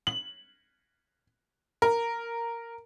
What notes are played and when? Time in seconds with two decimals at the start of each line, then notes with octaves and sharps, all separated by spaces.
0.07 F#7
1.82 A#4